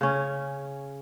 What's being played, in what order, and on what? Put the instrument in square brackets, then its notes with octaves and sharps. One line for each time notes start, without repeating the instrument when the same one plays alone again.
[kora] C#3 C#4